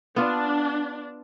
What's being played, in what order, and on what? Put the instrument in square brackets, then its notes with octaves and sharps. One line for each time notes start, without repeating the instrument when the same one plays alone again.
[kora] B3 F4 [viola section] D4